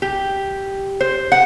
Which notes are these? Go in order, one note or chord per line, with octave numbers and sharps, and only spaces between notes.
G4
C5
F#5